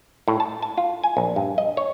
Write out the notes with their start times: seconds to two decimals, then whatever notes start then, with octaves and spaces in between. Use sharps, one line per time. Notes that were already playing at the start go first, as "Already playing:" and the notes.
0.28 A2
0.40 A5
0.62 A5
0.78 F4
1.04 G#5
1.17 A#1
1.36 G2
1.58 D#5
1.77 C#5